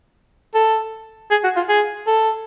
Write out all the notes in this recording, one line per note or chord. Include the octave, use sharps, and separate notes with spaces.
A4
G#4
F#4
F4
G#4
A4